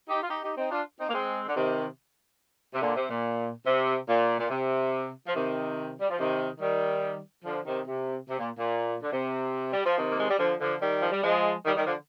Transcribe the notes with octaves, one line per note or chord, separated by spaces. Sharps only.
D#4 G4
F4
D#4 G4
D#4 G4
C4 D#4
D4 F4
C4 D#4
A#3
G#3 C4
D3
C3 D#3
C3
A#2 D3
C3
A#2
C3
A#2
A#2
C3
F3
C3 D#3
G3
F3
C3 D#3
D#3 G3
D3 F3
C3 D#3
C3
C3
A#2
A#2
D3
C3
G3
F3
C3 D#3
A#3
G#3
G3
D3 F3
D3 F3
D#3 G3
F3
G3
F3 G#3
D#3 G3
D#3 G3
D3 F3